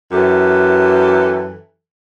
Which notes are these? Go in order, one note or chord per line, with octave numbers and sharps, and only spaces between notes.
F#2 E3 G4 A4